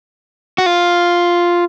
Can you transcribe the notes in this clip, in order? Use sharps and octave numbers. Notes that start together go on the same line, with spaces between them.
F#4
F4